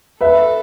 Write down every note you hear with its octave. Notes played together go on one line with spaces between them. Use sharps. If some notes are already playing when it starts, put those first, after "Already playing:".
A4 B4 E5